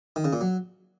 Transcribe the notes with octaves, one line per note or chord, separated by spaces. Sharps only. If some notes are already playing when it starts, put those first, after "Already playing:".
D#3
C#3
A#2
F#3